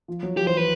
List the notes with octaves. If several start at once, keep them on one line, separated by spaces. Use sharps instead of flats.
F3
F#3
F3 G4
E3 C5
F3 B4